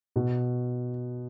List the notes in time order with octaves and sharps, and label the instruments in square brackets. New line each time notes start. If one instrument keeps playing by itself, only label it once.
[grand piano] B2